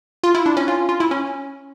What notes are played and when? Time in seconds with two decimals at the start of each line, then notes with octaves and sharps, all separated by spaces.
0.23 F4
0.35 E4
0.46 D4
0.57 C#4
0.68 F4
0.89 F4
1.00 E4
1.11 C#4